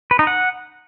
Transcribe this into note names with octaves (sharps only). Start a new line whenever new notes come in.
B4
D#4
F#5